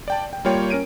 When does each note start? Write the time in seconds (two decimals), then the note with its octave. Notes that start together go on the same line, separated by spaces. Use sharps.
0.08 D5 G5 A5
0.33 G5
0.45 G3 A#3 F4 C#5 G5
0.70 C#4 A#4 D7 D#7